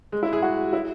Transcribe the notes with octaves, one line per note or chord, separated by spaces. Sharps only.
G#3
E4
G#4
F#4
E4